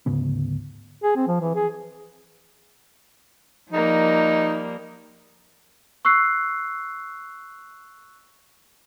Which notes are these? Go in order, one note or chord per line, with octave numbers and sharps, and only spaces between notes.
D2 G#2 C#3 B3
G#4
C4
F3
E3
G#4
F3 G3 A#3 D#4
C#6 E6 F#6 C7